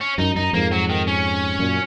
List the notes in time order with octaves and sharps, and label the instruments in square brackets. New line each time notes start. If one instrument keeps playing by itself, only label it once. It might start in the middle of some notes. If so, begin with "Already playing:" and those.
[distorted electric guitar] C#4
[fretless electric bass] F#2 [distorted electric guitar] D#4
[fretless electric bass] F#2 [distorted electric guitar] D#4
[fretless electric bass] F2 G#2 [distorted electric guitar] A#3
[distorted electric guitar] F#3
D#3
C#4
[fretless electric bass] F#2 A#2